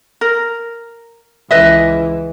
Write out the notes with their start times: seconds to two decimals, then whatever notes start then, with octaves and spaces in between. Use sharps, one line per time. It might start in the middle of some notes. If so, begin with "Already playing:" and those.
0.21 A#4
1.51 C#2 E3 B4 D#5 E5